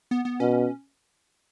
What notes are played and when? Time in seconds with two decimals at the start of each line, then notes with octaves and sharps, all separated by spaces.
0.11 B3
0.25 B3
0.40 B2 C#4